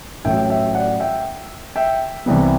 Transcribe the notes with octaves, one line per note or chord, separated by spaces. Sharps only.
A1 A2 F#3 E5 G5
E5 G5
D5 F#5
E5 G5
E5 G5
C2 C3 E3 G3 B3